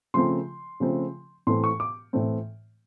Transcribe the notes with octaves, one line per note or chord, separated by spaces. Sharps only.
C#3 F3 A3 C4 C6
C#3 F3 A3 C4
A2 E3 A3 C4 C6
C#6
D6
A2 E3 A3 C4